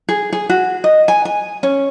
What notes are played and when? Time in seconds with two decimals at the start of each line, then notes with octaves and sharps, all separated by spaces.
0.09 G#4
0.33 G#4
0.49 F#4
0.84 D#5
1.08 G#5
1.25 G#5
1.63 C#4